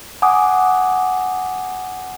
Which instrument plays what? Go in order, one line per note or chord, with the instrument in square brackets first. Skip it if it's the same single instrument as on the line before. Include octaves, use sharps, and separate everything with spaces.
[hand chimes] F#5 G#5 D6 D#6